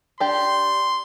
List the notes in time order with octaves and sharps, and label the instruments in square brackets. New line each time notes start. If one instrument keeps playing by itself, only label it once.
[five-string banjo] D4 G4 [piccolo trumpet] C6